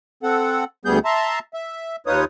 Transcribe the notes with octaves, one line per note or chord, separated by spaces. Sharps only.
C4 A4 F#5
D2 G3 B3 G#4 G6
E5 A5 A#5 C6
E5
D#2 D#4 F4 B4 C#5 D#6